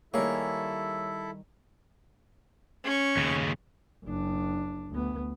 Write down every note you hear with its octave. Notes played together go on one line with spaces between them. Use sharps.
D#3 G3 A#3 E4 G#4 A4 C#5 E5
C#4 C#6
D#2 C#3
F#1 D4
D2 B3